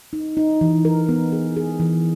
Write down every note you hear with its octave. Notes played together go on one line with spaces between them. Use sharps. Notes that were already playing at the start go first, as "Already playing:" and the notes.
D#4
D#4
E3
A#4
B3
G#4
G#4
E3